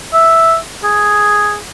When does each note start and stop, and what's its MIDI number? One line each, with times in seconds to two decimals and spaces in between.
0.13 0.56 76
0.84 1.58 68